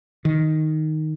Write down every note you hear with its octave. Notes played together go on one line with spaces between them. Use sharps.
D#3